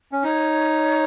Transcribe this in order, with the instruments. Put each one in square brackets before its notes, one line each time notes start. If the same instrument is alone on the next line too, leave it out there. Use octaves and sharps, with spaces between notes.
[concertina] C#4
[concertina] D#4 [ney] C#5